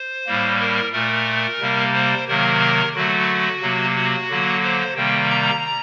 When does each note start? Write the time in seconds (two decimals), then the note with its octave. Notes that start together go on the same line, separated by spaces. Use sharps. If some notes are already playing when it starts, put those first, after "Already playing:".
Already playing: C5
0.26 A2 G3 A#3
0.61 A#4
0.93 A#2 A3 A#4
1.61 C3 G3 A#3
1.94 C5
2.29 C3 D#3 F#3 A#3 A#4
2.95 D3 F#3 A3 F#4
3.62 C3 F#3 A#3
3.97 F#4
4.30 D3 F#3 A#3
4.63 C5
4.96 C3 D#3 G3 A#3 G5
5.30 A#5